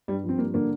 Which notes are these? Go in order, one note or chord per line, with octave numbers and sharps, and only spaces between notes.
G2 G3
F3
C4
G2 A#3
D3 A#3